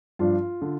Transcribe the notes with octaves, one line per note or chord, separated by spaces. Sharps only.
G2 F3 D4 F4
D3